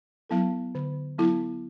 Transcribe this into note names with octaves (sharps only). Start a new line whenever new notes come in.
F#3 B3 E4 A4
D3
F#3 B3 E4 A4